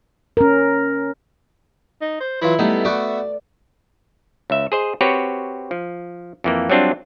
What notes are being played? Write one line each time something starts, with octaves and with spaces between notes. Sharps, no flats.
C#4 A#4
D#4
C5
E3 F#3 E4 F4
G3 A3 B3 D#4
A3 B3 F#4 D5 E5
C#2 E5
G#4 C5 D#5
C4 F#4 G4 B4 C#5
F3
F2 E3 A#3
F#3 G3 C4 D4 F4